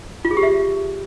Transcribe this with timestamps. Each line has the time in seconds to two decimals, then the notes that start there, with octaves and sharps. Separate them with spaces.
0.25 F4
0.31 G#4
0.37 G4
0.43 E5